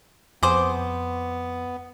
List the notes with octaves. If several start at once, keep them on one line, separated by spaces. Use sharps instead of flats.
F2 B3 G#4 C5 D6